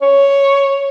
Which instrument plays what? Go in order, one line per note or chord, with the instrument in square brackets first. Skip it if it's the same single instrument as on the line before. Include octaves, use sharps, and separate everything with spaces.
[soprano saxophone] C#5